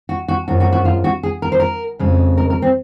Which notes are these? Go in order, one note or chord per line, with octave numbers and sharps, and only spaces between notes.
F#4
F#4
F#2 F3 G#3 F#4
F#4
F#4
F4
F#4
G#4
A#4
C5
A#4
F2 C#3 G#3
A#4
A#4
C4